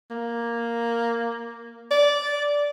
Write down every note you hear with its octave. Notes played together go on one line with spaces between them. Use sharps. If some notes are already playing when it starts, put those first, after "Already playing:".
A#3
D5